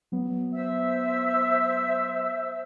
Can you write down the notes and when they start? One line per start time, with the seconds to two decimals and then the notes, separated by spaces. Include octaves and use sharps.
0.12 F#3 B3
0.52 C5 E5 E6